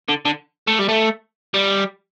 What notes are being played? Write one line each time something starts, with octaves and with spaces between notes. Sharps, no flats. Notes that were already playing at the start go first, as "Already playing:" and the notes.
D3
D3
A3
G3
A3
G3